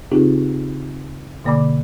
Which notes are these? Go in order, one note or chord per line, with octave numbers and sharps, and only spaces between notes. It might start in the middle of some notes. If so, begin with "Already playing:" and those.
C#3 C4 D#4 F4 G4 G#4
B2 D3 A#3 D5 B5 D6